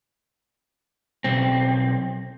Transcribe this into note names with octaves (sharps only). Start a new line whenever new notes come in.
B1 C4